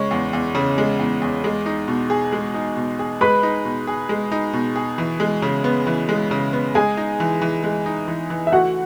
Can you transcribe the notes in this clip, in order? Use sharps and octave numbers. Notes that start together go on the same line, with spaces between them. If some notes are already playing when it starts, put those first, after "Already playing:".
Already playing: C#3 G#3 C#5 C#6
E2
E2
C#3
G#3
E2
E2
G#3
D#4
B2
G#4
G#3
D#4
B2
G#4
G#3 B4 B5
D#4
B2
G#4
G#3
D#4
B2
G#4
E3
G#3
C#3
B3
E3
G#3
C#3
B3
G#3 G#4 G#5
D#4
E3
E3
G#3
D#4
E3
E3
E5
A3 F#4 F#5